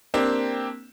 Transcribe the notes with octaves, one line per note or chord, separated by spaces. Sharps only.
A#3 C4 D4 G4